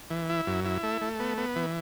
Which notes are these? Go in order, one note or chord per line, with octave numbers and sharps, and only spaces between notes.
E3
E4
F#2
E4
A3
A3
B3
B3
E3